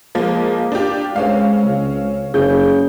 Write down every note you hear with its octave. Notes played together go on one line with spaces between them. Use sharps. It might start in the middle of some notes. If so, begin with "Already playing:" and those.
F3 G#3 A#3
D4 F4 G4
G#3 C4 C#4 F5
C#2
F#1 C#3 G6